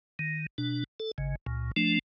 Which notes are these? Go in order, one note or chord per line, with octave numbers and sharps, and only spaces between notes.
D#3
B2 D4
A4
G#1 C#3
C#2 A#2
F3 A3 D4